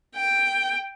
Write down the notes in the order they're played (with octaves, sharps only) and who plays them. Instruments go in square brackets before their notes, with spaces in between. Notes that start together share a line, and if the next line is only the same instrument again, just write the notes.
[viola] G5